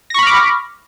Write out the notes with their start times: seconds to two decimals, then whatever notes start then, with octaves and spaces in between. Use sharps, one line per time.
0.10 A#6
0.14 C#6
0.19 B5
0.23 F6
0.27 D6